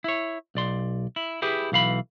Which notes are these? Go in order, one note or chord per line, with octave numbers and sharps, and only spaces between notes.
E4 C#5
B1 D5 C6
E4
E4 G4 G#4 B4
B1 E3 F5 B5